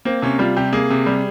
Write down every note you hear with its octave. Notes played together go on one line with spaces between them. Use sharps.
A#3 C4
C3 C#4
G3 F4
C3 G4
A#3 G#4
C3
G3